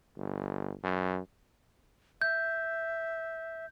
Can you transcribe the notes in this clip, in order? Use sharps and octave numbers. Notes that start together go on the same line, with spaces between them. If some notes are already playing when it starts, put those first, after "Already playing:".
G1
F#2
E5 G6